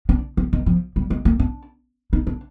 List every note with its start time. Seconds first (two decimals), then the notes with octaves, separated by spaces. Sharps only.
0.09 D4
0.37 F3
0.53 D#3
0.66 F3
0.96 G3
1.10 G#3
1.25 A#3
1.39 D4
2.13 D#4
2.27 D4